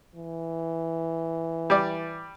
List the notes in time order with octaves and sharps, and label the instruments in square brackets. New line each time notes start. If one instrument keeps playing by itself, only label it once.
[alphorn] E3
[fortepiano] G3 D5